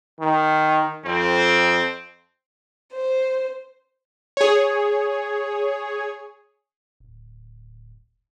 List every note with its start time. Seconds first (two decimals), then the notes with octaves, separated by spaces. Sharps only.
0.20 D#3
1.05 F2 C4
2.93 C5
4.37 G#4 C#5
7.00 D1